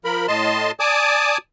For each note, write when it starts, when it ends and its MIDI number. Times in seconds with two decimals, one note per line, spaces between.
0.05 0.27 53
0.05 0.27 70
0.05 0.27 83
0.28 0.71 45
0.28 0.71 75
0.28 0.71 81
0.28 0.71 84
0.80 1.38 74
0.80 1.38 80
0.80 1.38 81
0.80 1.38 86
0.80 1.38 87